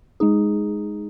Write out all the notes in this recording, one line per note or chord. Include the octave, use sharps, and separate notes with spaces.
G#3 D#4 G#4